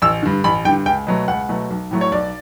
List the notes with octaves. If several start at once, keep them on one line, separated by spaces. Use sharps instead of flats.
A1 E6
G2 D3
A1 B5
G2 D3 G5
C#2 G5
B2 F#3 A3
C#2 F#5
B2 F#3 A3
B1
A2 F#3 A3
C#5
B1 D5